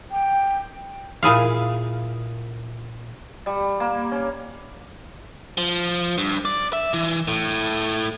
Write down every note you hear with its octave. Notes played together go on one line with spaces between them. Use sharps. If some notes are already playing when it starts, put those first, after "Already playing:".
G5
A#2 E4 G#4 F5
G3
A#3
C#4
F3
G2
D5
E5
E3
A2